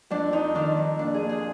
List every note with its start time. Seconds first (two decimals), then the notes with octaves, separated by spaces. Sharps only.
0.10 F2 D4
0.33 F2 D#4
0.55 D#3 D4
0.77 F2
0.99 A#2 D4
1.14 G#4
1.21 A#2
1.29 G#4